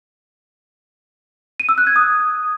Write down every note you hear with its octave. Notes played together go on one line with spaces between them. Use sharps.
D#7
E6
F#6
G#6
D#6